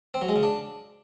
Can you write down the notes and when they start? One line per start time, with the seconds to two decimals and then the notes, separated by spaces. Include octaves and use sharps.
0.14 C4
0.21 F#3
0.29 G#3
0.36 C#3
0.43 D4